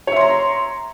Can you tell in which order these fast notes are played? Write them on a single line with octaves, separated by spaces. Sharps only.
C#5 E5 C6 A#5